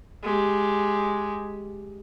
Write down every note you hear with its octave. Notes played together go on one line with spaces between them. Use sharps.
G#3 G4